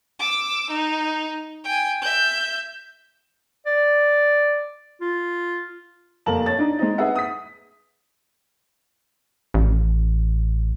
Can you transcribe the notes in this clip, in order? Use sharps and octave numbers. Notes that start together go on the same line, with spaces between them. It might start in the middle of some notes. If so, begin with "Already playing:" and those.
D6 E6
D#4
G5 G#5
E5 G6
D5
F4
F1 A#3 A#4 A5 F#7
C#5 A6
D4 D#4
G#3 C4 D#4
G#4 B4 E5 F#5
D#6 B6
A1